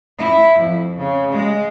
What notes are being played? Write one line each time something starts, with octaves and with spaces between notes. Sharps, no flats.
E4
F2
C#3
G#3